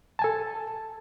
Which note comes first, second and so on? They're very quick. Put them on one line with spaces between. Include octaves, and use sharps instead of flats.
A5 G#5 A4